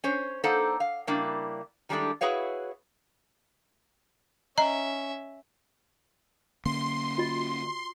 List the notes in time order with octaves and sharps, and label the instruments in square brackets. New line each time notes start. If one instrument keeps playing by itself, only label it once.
[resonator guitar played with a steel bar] C#4 C5 C#5
A#3 D4 D#4 A4 C5 F#5
F5
C#3 G3 A#3 D4 E4
D#3 G3 G#3 D4 E4 A4
E4 F#4 G#4 B4 C#5 F5
[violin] C#4 E5 [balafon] D#5 A#5
[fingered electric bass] D3 A#3 C#4 [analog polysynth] C6
[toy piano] F4 F#4 D#5